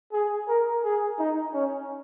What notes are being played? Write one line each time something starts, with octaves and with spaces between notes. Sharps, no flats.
G#4
A#4
G#4
D#4
C#4